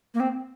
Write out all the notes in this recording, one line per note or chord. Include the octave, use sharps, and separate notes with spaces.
A#3
C4